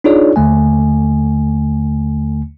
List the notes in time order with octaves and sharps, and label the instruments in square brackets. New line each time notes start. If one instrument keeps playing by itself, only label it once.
[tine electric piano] D4 D#4 F4 G#4 C#5 D5
D#2 D3 A3 G#5